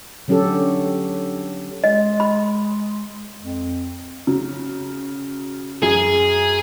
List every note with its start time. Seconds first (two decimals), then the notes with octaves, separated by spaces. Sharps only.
0.28 D3 F#3 C#4 G4 A4
1.84 G#3 D#5
2.20 B5
3.42 F2
4.27 C#3 F#3
5.83 F#2 G#4